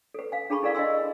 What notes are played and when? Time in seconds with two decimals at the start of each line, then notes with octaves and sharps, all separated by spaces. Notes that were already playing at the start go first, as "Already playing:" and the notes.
0.14 A4 B4
0.32 F5 G#5
0.50 D4 G#4 A5 B5 C#6
0.63 E4 A4 A#4 D5 F5 B5
0.75 D#5 F5 G#5 C6 E6